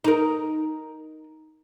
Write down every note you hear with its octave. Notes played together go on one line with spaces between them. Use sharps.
D#4 A#4